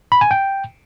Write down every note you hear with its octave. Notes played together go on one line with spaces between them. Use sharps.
B5
G#5
G5